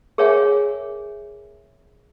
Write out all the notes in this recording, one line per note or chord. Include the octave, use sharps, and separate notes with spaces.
G#4 A#4 C#5 E5 F#5 G#5